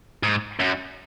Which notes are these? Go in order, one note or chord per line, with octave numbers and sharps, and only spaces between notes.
G#2
F#2